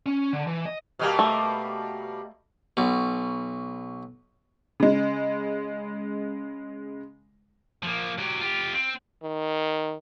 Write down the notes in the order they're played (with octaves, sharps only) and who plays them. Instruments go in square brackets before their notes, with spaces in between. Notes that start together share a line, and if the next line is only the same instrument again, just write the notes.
[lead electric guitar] C#4
D3
E3
D#5
[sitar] B2 G3 A#3
[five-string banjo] A3
[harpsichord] B1 B2
[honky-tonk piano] C#3 G#3
[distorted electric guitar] F3 A#3
F#3 G4
F4 G4
C4
[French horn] D#3